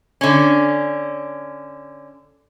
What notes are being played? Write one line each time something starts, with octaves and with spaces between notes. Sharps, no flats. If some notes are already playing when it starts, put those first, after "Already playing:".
D3 C#4